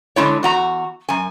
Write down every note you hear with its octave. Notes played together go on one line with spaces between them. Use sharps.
D3 G#3 E4 C#5
E2 F#4 A#5
F#2 G#5